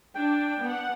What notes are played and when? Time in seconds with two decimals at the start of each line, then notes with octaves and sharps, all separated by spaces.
0.15 D4 G5
0.63 B3 F#5